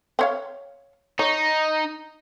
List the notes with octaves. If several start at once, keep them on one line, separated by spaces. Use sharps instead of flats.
C4 C#5 F5
D#4 C#5